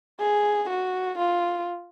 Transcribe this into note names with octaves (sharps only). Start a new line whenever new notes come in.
G#4
F#4
F4